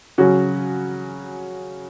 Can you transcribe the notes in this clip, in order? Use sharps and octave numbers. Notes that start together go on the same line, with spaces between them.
C#3 F#3 C#4 F#4